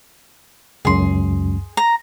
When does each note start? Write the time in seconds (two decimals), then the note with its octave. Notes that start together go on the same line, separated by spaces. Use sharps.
0.85 C#2 F#2 G#4 C6
1.77 A#5